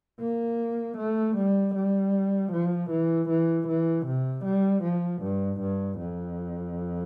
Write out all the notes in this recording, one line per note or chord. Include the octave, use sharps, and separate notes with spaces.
A#3
A3
G3
G3
F3
E3
E3
E3
C3
G3
F3
G2
G2
F2